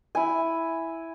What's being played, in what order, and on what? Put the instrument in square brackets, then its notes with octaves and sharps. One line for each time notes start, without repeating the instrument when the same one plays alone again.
[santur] E4 G#5